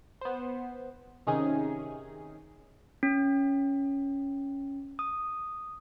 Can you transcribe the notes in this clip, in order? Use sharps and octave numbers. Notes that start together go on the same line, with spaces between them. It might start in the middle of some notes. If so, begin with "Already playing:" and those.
B3 C5
C3 D#3 C#4 D#4 G#4
C#4
D#6